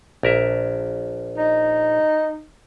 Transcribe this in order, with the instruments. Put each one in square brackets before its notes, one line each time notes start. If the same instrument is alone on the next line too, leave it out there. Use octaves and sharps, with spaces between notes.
[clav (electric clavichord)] A#1 A#4 E5
[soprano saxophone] D#4